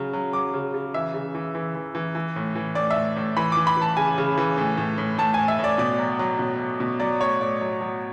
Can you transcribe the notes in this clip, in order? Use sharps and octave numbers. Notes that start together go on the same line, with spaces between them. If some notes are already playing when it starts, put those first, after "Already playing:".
Already playing: C#3 F#3
F#3
F#3 D6
C#3
C#3
E3 E5
C#3
E3
E3
E3
E3
E3
A2
E3
A2 D5
E5
A2
A2
E3 B5
E3 D6
B5
E3 A5
C#3 G#5
C#3
E3
A2
A2
A2
A2 A5
A2 G#5
E5
A2
D5
B2 D5
F#3
F#3
B2
F#3
B2
F#3 D5
A2 C#5
A2 D5
F#3
F#3